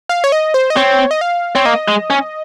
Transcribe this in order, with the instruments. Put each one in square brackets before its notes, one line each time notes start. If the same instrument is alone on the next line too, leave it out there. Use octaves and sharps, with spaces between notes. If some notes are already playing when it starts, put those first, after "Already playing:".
[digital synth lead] F5
C#5
D#5
C5
D#5
[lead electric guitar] C4 [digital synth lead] C#5
[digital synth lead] D#5
F5
[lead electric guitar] C4 [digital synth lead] C#5
[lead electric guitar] A#3 [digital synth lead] D#5
[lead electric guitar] G#3
C#4